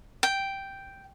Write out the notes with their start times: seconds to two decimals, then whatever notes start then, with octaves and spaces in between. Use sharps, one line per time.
0.23 G5